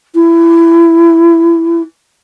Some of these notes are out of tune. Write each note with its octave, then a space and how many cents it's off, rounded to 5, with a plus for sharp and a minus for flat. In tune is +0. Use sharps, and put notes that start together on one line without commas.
E4 +20